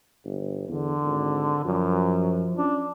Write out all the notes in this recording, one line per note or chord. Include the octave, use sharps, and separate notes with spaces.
G1
E2 D3
G#1
F#2 F3
C#4 D4